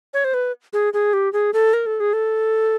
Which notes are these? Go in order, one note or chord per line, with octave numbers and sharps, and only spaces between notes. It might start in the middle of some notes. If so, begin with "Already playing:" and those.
C#5
C5
B4
G#4
G#4
G4
G#4
A4
A#4
A4
G#4
A4